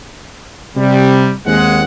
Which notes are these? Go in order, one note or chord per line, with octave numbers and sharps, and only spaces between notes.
C3 G3
D#2 G#3 C4 F#5